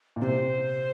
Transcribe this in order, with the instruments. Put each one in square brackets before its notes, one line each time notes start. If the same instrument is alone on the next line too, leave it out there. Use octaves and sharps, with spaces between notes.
[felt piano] A#2
[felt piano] C3 [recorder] C5